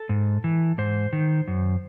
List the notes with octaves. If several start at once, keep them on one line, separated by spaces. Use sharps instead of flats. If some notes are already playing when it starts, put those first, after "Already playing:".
Already playing: A4
G#2
E3
G#2 C5
D#3
F#2